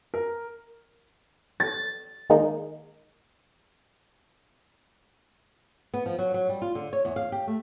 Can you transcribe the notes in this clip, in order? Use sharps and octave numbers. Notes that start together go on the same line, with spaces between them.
A#4
A6
D#3 G#3 A#3 D#4
B3
F3
F#3
F#3
G3
F4
D3
C#5
E2
F5
G4
A3